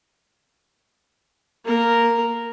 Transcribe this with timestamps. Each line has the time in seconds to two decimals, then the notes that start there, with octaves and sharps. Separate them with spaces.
1.65 A#3 A#4